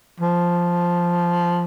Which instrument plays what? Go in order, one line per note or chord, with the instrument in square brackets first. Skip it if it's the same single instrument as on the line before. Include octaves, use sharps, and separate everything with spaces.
[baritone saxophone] F3